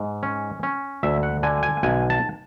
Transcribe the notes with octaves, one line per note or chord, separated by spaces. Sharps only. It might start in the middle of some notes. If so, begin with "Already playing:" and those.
Already playing: G#2
C#4
C#4
D2 E5
F#5
D3 G#5
G#5
B1 G#5
A5